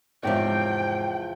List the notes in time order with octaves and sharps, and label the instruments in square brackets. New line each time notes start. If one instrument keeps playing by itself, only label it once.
[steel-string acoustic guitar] E2 C3 F3 [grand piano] G#2 C#5 [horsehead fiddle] G5